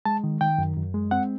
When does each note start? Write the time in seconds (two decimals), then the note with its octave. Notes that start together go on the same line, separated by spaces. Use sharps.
0.05 G#3 A5
0.24 D#3
0.41 D#3 G5
0.58 F#2
0.76 F#2
0.94 G#3
1.11 C4 F#5